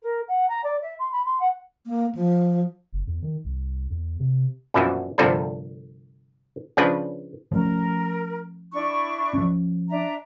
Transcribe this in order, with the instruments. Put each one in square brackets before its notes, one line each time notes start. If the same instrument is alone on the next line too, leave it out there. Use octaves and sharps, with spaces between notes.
[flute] A#4
F#5
A#5
D5
E5
C6
B5
C6
F#5
[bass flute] A#3
F3
[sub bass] F#1
E2
D#3
C2
E2
C3
[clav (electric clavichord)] A#1 F#2 B2 E3 F3 E5
G1 C2 C3 F3 D4 A4
C#3 F3 D4 B4
[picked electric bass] F3 A3 C#4 [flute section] A#4
[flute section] D4 E4 C#6
[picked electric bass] F3 C#4
[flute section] D4 E5 A#5